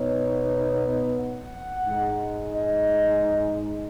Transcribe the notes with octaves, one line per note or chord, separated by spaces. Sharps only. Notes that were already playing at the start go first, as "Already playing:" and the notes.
Already playing: B2 B3 D#4 C#5
F#5
G#2 G#3 D#4
D#5